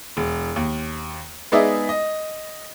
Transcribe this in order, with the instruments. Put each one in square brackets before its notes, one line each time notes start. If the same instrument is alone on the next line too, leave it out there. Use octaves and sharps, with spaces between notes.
[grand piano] E1
D#2
G#3 B3 D#4 G#4 D5 E5
D#5